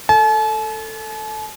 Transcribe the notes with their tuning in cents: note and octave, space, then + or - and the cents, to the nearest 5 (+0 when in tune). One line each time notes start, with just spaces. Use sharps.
A4 +15 A5 -45